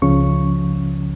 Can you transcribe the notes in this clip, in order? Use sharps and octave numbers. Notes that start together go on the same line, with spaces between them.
C#2 C#3 F3 C#4 C#6